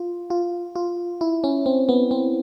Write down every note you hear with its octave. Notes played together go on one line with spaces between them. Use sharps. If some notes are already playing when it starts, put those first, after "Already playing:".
Already playing: F4
F4
F4
E4
C#4
C4
B3
C4